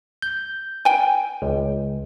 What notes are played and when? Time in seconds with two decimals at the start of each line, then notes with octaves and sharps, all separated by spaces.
0.22 G6
0.85 G5 G#5
1.42 C#2